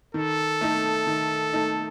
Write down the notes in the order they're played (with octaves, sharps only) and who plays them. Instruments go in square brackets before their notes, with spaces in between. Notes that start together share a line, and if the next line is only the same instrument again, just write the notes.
[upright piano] D#3 [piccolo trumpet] A4
[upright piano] A3 D#4
D#3
A3 D#4